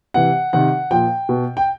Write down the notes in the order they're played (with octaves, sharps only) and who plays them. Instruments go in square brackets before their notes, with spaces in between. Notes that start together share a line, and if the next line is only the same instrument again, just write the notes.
[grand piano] C3 E3 F#5
C3 D#3 F#5
A#2 F3 G5
B2
G5